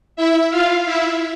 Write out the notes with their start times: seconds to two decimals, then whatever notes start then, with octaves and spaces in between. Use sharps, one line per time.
0.16 E4 E5
0.50 F4 F5
0.86 E4 E5